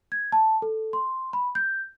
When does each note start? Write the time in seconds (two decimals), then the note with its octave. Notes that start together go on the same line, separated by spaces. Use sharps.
0.12 G#6
0.32 A5
0.62 A4
0.93 C6
1.33 B5
1.55 G6